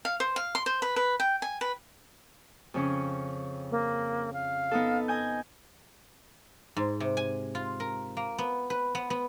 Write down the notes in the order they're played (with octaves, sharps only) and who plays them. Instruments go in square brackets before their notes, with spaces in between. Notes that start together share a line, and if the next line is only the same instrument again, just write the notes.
[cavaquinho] F5
C5
F5
C6
C5
B4
B4
G5
G#5
B4
[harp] F2 C#3 C#4
[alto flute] A#3
F5
[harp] B3 D#4 A4
D#5 G#5 G6
[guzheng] G#2
C3
G#5
F4
A#4
A#3
B3
B4
B3
B3